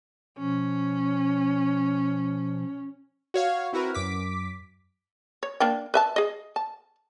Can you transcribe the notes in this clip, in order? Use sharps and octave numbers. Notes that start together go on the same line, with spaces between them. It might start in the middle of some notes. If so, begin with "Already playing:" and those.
B2 F3 C#4
F#4 C#5 F5
C4 E4 F#4 A#4 B4
F#2 D6 B6
C#5
A#3 D4 G5
B4 E5 A5
G#4 D#5
A5